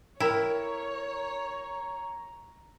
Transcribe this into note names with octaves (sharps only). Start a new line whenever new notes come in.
E4 A4 A#4 C#5 G5 A#5